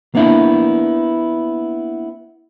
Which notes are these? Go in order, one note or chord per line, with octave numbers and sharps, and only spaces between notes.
A#3 B3 D4 E4